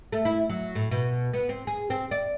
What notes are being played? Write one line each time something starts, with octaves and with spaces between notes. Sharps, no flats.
A3
E4
F#3
A2
B2
B3
C4
G#4
C4
D5